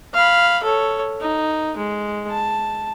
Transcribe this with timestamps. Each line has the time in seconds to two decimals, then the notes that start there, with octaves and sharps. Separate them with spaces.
0.14 F5 B5
0.63 A4 C#5
1.21 D#4
1.77 G#3
2.30 A5